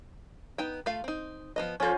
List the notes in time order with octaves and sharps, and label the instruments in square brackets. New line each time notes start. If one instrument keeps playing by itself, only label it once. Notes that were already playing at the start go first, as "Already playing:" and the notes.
[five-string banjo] B3 D#4 G5
A3 F4 F5
C4 D#4
F3 B3 D#5
[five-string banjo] F3 A4 [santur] C#4 F4 C5